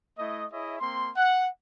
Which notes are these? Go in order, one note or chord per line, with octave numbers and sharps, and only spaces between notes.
A3 E4 D#5
E4 G#4 C#5 D#5 E5
A#3 C4 C6
F#5